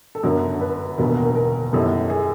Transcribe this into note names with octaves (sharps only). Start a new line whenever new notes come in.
A4
G1 F#2 D3 F#3 A#4
B4
E1 D#2 D3 F#3 B3 A#4
A#4
A#4
F#2 D#3 G3 B3 E4 A4
G#4